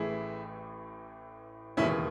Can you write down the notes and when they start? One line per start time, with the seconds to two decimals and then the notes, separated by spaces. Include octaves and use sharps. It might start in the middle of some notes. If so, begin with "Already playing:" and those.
Already playing: A1 A2 E3 E4 G#4
1.77 E1 D#2 C#3 E3 C#4 E4